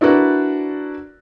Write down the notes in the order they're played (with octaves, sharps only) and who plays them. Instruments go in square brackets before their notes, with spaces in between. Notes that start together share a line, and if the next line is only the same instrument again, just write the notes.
[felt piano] D4 E4 F#4 A#4 B4 D5